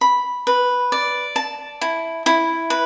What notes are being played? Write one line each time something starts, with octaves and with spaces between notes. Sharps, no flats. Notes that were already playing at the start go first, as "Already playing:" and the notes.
B5
B4
D5
A5
E4
E4
B4